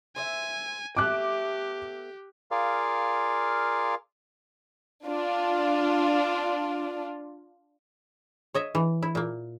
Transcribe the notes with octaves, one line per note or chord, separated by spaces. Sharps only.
C5 D5 E5 G#5
A3 B3 G4 E5 D6 F#6
F4 G#4 A#4 D5 F5
D4 F4
C#5 D#5 E5
E3
E4
A#2 A#3